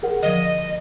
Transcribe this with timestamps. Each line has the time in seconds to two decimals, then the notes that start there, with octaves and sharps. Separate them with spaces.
0.03 G#4 A#4 F#5
0.23 D3 F3 D#5